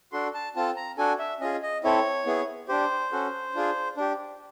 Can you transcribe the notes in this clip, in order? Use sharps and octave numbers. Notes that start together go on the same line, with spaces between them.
D4 F#4 A4 C6
A5
C4 F4 A4 A5
A#5
D4 F#4 A4 G#5
E5
C#4 F4 G#4 D#5
D#5
C4 E4 A4 C#5
B3 E4 G#4
D4 G4 C5
C#4 F#4 A4
D4 F4 G#4
D4 G4